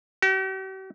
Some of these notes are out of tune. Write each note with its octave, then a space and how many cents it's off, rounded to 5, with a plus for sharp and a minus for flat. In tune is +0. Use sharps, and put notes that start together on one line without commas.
G4 -45